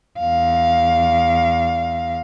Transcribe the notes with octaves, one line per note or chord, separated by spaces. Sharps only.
E2 F5